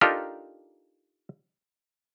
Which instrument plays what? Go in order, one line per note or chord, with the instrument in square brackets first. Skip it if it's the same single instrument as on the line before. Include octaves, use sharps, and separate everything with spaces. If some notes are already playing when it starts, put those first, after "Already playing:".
[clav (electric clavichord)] D4 D#4 F4 G4 A4 A#4